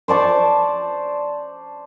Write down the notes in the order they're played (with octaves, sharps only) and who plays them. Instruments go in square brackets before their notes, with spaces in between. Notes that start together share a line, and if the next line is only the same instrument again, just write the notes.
[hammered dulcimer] C5 D5 A5 C#6